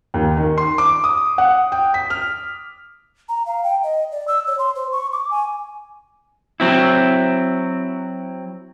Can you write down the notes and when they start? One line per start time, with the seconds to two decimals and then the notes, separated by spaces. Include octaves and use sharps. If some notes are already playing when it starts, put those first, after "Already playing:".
0.14 D#2
0.37 D#3
0.58 C6
0.78 D6
1.04 D#6
1.38 F#5
1.72 G5
1.94 B6
2.10 F6
3.29 A#5
3.46 F5
3.63 G5
3.83 D#5
4.12 D5
4.28 E6
4.47 C#5
4.59 C6
4.75 C5
4.92 C#6
5.13 D6
5.31 G#5
6.60 F#3 C4 E4